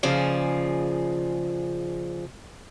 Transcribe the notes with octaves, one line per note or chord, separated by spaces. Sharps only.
D#2 C#3 F3 G#4 D5